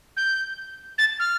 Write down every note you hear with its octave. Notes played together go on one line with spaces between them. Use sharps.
G6
A6
F6